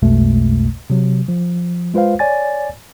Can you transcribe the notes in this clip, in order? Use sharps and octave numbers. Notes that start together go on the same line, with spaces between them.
B1 F2 B2 G#3 A3
C3 F#3
F3
G#3 F4 B4 C5 F5
C#5 D5 G#5 A6